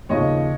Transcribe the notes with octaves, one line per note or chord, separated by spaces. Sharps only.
D#2 C#3 F3 C#5 D#5